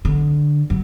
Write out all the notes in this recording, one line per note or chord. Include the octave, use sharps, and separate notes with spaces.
D3
F#3